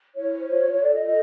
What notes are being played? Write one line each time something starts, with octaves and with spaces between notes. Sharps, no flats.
E4 C#5
C5
F4
F4
A4 D5
D#5
A4
D#5